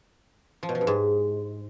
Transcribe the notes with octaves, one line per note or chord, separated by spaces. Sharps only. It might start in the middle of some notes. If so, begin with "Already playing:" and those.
F3
B2
F3
G2
G#2